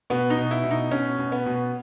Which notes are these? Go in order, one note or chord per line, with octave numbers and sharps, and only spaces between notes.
B2 B3
D#4
B2
E4
B2
D#4
B2 C#4
B2
B3
B2